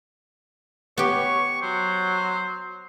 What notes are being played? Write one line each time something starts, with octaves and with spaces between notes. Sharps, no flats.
B3 G4 C#5 C#6
F#3 C5